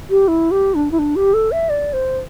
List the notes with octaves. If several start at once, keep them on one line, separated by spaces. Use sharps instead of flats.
G4
E4
G4
D4
E4
D4
G4
A4
E5
D5
C5